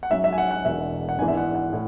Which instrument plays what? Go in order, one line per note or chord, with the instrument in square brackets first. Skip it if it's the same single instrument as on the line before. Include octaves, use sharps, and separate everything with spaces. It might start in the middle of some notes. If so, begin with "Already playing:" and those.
[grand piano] F#5
[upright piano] G#2 F#3 C#4 [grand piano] E5
[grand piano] E5
G#5
F#5
F#5
[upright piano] E1 E2 B2 [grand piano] E5
[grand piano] F#5
[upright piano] G#1 G#2 E3 B3 D4 [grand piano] G#5
[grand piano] E5
F#5
F#5
[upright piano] A2